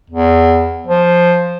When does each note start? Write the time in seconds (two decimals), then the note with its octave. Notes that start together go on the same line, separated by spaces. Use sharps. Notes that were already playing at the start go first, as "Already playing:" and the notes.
0.10 E2
0.87 F3